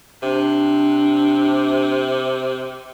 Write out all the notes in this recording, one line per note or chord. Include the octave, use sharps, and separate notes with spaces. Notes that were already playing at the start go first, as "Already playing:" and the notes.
C3 D4